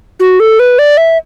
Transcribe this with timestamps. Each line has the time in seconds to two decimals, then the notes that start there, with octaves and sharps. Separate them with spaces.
0.20 F#4
0.40 A4
0.59 B4
0.79 D5
0.97 E5